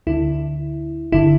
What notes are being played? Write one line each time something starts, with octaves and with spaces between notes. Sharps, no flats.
D2 D3 E4
G1 D3 E4